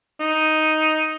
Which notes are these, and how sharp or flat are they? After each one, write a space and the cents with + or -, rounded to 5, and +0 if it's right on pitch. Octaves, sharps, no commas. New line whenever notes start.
D#4 +5